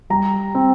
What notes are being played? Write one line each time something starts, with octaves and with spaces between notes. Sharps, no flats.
G3 A#5
C4